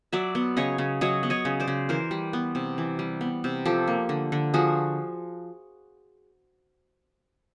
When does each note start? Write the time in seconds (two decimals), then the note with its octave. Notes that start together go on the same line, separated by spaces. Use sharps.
0.12 F#3 D5 E5
0.35 B3
0.57 C#3 C#5 D#5
0.78 C#3
1.01 F#3 C#5 D#5
1.23 B3
1.30 C#5 D#5
1.45 C#3
1.60 C5 D5
1.67 C#3
1.89 E3 A#4 C5
2.11 G3
2.33 B3
2.55 C3
2.78 E3
2.99 G3
3.21 B3
3.44 C3
3.66 F3 G4 A4
3.88 A#3
4.09 D3
4.32 D3
4.54 F3 F#4 G#4